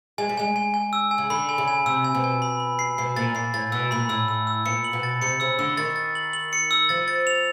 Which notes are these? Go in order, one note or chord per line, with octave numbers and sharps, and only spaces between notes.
G#3 G#5
G3
G#3 G#5
G#5
G#5
E6
G#5
C#3
D3 B5
G#5
C#3
G#5
C3 E6
G#5
B2
G#5
B5
B5
C7
B2 C7
A#2 A6
A#2 C7
A2 A6
B2 E6
A#2 B5
A2 E6
E6
E6
A#2 C#7
F#7
B2
A6
C3 C#7
C#3 E6
D3 E6
D#3 A6
A6
F#7
F#7
C#7
E6
F3 A6
A6
F7